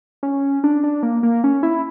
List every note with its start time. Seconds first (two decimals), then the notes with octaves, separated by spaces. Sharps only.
0.23 C#4
0.64 D4
0.84 D4
1.03 A#3
1.23 A#3
1.44 C#4
1.63 E4